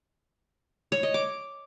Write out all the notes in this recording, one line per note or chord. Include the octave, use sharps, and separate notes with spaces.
C#5
D#5
D6